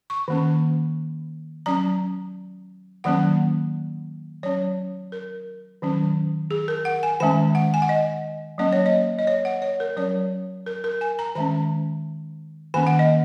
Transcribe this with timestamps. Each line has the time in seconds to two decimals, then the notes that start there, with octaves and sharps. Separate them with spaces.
0.10 C#6
0.28 D#3 A#3 C#4
1.66 F#3 C#4 A#5
3.04 D#3 F#3 A#3 C#4 F#5
4.43 F#3 C#4 C#5
5.12 A#4
5.82 D#3 F#3 C#4
6.51 G#4
6.68 A#4
6.85 F#5
7.03 G#5
7.20 D#3 G#3 C#4 G#5
7.55 F#5
7.74 G#5
7.82 F#5
7.89 D#5
8.58 F#3 A#3 C#4 D#5
8.73 C#5
8.86 D#5
9.19 D#5
9.27 C#5
9.45 F#5
9.62 C#5
9.80 A#4
9.97 F#3 C#4 C#5
10.66 A#4
10.84 A#4
11.01 G#5
11.19 A#5
11.35 D#3 G#3 C#4 A#5
12.74 D#3 A#3 C#4 G#5
12.87 F#5
12.99 D#5